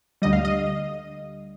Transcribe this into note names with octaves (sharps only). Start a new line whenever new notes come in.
D2 D3 G3 D#5
F5
D#5